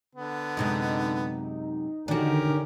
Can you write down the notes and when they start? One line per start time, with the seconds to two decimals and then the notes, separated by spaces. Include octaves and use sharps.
0.15 D3 B3
0.57 F#2 C3 G#3 D#4
2.08 D3 D#3 C#4 D4 F#4 G4 A#4